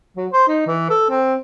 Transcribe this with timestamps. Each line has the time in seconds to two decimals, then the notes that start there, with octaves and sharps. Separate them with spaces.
0.17 F#3
0.32 C5
0.48 D#4
0.67 E3
0.90 A4
1.10 C4